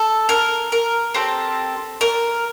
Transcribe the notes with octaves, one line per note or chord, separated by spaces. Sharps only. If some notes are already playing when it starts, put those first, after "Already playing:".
Already playing: A4
A#4
A#4
C4 G4 A4
A#4